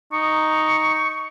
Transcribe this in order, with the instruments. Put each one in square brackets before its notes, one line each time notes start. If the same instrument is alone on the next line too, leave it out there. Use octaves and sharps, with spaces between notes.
[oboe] D#4 [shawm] C#6